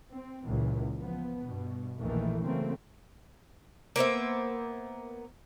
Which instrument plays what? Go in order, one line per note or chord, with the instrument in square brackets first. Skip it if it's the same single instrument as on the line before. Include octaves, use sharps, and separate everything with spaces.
[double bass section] C4
C#2 A#2 E3
F3 B3
G2 B2
A#1 E2 D#3 E3 A3 A#3
C#3 E3 F#3 A3 A#3 C4
[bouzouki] A#3 B3 C5 E5